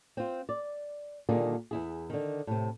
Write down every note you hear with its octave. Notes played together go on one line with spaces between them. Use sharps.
C4 F4
D5
A#2 D3 D#3 G3 A#3 G#4
E2 E4 G#4
D3 D#3
A2 C3